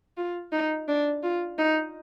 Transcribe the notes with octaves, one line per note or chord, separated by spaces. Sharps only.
F4
D#4
D4
F4
D#4